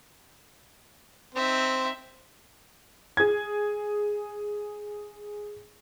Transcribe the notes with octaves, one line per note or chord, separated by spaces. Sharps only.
C4 D#4 E5
G#4 G#6